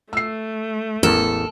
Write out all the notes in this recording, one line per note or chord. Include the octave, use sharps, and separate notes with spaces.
A3 E6 C7
A1 E2 A4 A#4